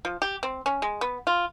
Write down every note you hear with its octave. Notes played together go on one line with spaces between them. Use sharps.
F3
G4
C4
C#4
G#3
B3
F4